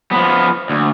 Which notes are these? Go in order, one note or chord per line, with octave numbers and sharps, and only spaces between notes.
F3 B3
D2